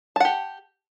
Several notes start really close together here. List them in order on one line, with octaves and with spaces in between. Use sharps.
A5 F#5 G4